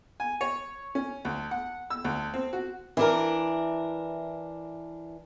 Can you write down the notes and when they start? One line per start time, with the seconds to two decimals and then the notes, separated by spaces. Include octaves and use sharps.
0.20 G#5
0.41 C#5
0.95 C#4
1.25 D2
1.51 F#5
1.90 E6
2.04 D2
2.34 C4
2.53 F#4
2.97 E3 D4 A#4